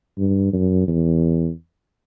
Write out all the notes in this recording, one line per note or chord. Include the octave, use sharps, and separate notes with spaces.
G2
F#2
E2